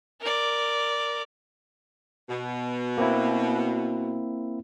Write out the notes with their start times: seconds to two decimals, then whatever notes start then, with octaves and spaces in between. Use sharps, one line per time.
0.21 A#4 D5
2.29 B2
2.98 A#3 C4 E4